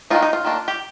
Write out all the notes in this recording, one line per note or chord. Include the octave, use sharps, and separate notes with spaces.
D#3 G#3 C4 D#4 F4
D#4
F4
D#3 A#3 D4
G4